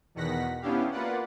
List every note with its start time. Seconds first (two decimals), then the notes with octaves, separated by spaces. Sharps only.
0.15 E2 B2 D#3 F#5 A#6 B6
0.61 B3 C#4 D4 E4 G4 F5
0.91 A#3 F4 B4 D5 F#5